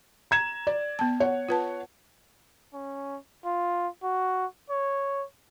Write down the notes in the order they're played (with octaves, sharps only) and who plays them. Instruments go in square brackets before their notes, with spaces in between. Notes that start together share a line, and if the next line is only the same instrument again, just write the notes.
[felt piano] A#5 G#6 E7
D5
[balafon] B3 A5
[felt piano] C#5 F#5
[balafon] F4 B4 A5
[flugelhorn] C#4
F4
F#4
C#5